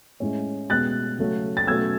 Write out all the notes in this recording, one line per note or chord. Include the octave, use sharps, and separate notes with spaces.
A2 G#3 C#4
B2 G#3 B3 F#6 A6
C#3 F#3 A3
A6
B2 F#3 A3 C#4 E6 G#6